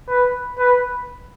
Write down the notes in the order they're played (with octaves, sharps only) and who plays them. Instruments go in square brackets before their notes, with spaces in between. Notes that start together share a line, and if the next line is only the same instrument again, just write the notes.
[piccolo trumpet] B4
B4